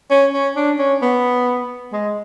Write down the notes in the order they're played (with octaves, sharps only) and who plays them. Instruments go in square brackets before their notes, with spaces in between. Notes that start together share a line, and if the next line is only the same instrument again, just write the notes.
[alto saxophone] C#4
C#4
D4
C#4
B3
G#3